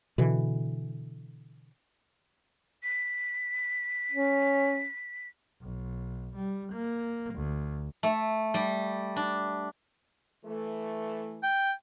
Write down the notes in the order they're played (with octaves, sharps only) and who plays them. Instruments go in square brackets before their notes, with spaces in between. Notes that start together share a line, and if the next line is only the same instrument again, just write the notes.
[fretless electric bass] B2 D3 E3
[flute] B6
[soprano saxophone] C#4
[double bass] B1
G3
A#3
D2
[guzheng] A3
G3
D4
[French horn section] E3 A3
[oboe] G5